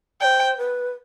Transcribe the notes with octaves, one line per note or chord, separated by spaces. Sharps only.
C5 D5 G5
B4